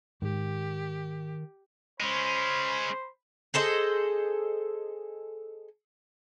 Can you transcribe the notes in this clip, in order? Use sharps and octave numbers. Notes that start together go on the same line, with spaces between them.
G#2 D#3 G4
G#3 C#4 C5 B5
G#4 A4 C5 D#5